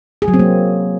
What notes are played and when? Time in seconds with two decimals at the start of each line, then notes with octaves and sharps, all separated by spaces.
0.22 G#4
0.28 F#3
0.34 C4
0.39 A#3